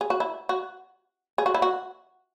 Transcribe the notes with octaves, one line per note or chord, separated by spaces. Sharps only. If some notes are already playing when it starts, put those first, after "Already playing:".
G#4
F#4
E4
F#4
G#4
F#4
E4
F#4